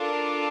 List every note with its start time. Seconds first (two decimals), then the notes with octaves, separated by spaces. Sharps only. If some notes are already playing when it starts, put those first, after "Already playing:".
Already playing: D4 F4 A4 A#4